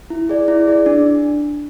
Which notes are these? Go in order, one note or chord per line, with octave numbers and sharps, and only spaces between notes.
E4
G#4 D5
E4
G#4 D5
D4